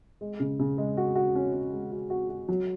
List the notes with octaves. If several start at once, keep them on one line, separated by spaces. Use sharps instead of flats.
G#3
C#3
C#3
G#3
F#4
F#4
C#4
C#4
G#3
F#4
F#4
F#4
F#3